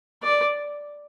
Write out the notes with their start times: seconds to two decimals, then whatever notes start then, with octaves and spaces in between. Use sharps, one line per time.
0.23 D5